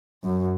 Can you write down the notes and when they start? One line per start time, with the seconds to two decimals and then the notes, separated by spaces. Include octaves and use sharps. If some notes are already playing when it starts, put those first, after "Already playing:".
0.25 F#2